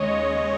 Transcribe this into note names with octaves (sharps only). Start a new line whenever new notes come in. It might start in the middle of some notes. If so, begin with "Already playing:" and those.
Already playing: D#2 C#3 G#3 C#5 D#5
C#5